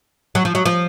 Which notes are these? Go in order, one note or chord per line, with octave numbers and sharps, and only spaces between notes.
F#3
F3
F#3
F3